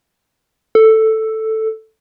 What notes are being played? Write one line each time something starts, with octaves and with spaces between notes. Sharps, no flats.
A4